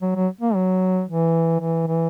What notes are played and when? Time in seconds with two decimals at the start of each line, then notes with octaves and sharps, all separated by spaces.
0.02 F#3
0.16 F#3
0.41 A#3
0.55 F#3
1.08 E3
1.60 E3
1.87 E3